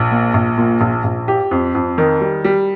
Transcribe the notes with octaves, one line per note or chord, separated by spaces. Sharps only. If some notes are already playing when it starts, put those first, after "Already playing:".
Already playing: A#1
A#2
A#1
A#2
A#1
A#1
G4
F2
F2
D#3
G3
G3